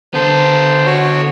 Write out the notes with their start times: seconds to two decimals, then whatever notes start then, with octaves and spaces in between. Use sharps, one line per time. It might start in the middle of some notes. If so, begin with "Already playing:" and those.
0.14 D3 B3 A4 C5
0.86 F#4 C#5